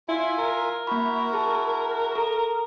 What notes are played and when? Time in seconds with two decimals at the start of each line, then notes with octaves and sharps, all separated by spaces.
0.08 E4 F4 E5 G#5
0.38 A#4
0.87 A#3 E4 F#4 B5
1.33 G#4 A5
2.12 A4 A#5